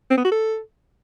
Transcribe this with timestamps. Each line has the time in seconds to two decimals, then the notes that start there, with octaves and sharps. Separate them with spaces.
0.11 C4
0.18 B3
0.25 F#4
0.32 A4